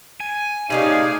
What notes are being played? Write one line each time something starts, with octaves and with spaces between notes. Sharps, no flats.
G#5
C3 A3 C#4 D#4 G#4 D5 F5